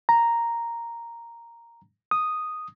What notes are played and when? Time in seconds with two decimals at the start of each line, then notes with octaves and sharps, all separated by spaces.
0.09 A#5
2.11 D#6